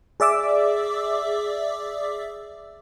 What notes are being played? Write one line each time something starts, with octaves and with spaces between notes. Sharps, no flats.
G#4 D5 E5 D6 E6